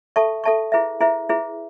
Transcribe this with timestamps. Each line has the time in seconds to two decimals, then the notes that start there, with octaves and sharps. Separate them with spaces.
0.16 A4 E5 A5 C#6
0.44 A4 E5 A5 C#6
0.72 E4 G#4 B4 E5
1.00 E4 G#4 B4 E5
1.29 E4 G#4 B4 E5